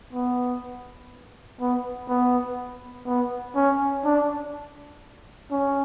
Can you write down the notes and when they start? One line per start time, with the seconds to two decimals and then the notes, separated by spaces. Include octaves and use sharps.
0.13 B3
1.60 B3
2.08 B3
3.06 B3
3.55 C#4
4.05 D4
5.51 C#4